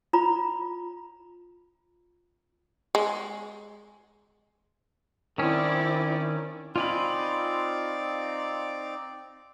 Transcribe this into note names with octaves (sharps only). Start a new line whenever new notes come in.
F4 A#5 B5
G#3
D#3 C4 C#4 E4 D5
C4 D#4 F4 D5 G#5 B5